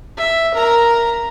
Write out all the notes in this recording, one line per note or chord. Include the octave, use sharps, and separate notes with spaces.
E5
A#4 A#5